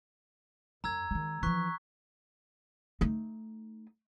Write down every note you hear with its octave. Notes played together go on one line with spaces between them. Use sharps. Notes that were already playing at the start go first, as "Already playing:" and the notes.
F#2 A#5 E6 G#6
D#3 G#3
E3 F3 C#6 F#6 B6
A3 D#4